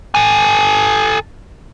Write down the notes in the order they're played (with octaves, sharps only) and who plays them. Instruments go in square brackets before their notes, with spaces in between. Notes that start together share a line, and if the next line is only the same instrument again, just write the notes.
[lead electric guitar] A4 G#5